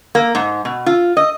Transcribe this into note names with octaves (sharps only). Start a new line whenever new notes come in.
A#3
G#2
B2
F4
D#5